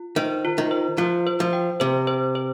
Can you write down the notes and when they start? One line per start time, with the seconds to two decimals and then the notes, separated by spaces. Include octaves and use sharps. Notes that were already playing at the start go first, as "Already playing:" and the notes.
Already playing: F4
0.16 D#3 C5
0.45 F4
0.58 D#3
0.71 C5
0.98 F3 F4
1.27 C5
1.40 F3
1.53 G5
1.80 C3 C5
2.07 C5
2.35 C5